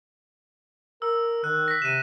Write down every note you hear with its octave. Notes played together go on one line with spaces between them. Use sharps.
A#4 E6
D#3 F#6
A#6 B6
C3 D#7 E7